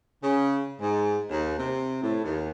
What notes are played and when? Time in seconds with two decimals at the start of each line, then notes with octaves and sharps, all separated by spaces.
0.23 C#3
0.80 G#2
1.30 D#2
1.58 C3
2.02 A2
2.24 D#2